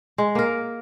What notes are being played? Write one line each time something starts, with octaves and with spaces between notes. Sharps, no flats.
G#3
A#3 A#4